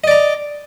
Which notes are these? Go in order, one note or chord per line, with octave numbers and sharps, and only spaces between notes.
D5 D#5 A#5